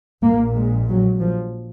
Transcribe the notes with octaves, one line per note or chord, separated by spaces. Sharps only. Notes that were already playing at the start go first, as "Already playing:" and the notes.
A#1 A#2 A#3
G#3
F#3
F3